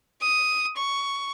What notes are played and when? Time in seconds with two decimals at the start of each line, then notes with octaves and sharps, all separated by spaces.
0.22 D#6
0.77 C#6